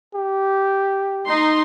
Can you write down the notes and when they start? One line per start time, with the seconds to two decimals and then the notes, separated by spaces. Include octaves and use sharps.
0.14 G4
1.27 D#4 C6